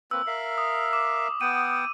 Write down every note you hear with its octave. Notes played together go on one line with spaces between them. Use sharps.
A#3 C4 B4 E6
A#4 E5 F5
D#6
D6
B3 F#5 G5 D#7